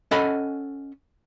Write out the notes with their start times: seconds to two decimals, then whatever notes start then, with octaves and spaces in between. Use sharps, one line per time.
0.11 C#4 A4 D#5 F#5 G#5 B5